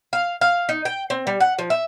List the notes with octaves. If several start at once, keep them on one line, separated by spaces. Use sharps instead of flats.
F5
F5
D#4
G5
C4
G3
F#5
F3
E5